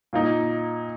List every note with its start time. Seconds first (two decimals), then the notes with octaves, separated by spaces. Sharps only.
0.13 A#2 A#3 D#4